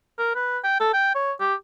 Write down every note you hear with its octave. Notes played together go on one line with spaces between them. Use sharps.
A#4
B4
G5
A4
G5
C#5
G4